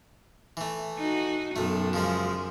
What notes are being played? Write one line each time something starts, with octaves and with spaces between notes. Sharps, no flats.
E3 A3
D#4 F#4
B1 F#2 A3
C#3 F3 G#3